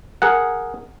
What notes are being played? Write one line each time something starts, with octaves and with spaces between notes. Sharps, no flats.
G#4 A#4 F#5